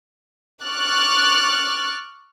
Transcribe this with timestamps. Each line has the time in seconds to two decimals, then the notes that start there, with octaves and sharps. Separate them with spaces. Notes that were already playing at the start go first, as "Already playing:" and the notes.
0.63 C#6 D6 F6 F#6 A6